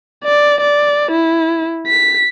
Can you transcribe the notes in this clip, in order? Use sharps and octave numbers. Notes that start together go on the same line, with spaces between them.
D5
D5
E4
B6